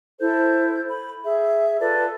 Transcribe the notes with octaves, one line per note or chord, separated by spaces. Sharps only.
E4 A4 C5 G6
B5
G#4 E5
F4 A4 B4 D5